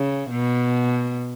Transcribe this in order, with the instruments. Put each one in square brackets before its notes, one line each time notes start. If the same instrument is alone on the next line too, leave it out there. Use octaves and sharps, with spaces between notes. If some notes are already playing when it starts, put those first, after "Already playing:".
Already playing: [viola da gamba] C#3
B2